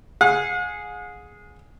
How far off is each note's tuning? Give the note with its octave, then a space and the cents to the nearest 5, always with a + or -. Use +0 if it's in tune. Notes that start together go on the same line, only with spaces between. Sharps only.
G#4 +0 F#5 -45